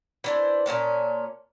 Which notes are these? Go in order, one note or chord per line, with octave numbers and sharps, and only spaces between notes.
E3 D4 C5
A#2 C4 C#4 A5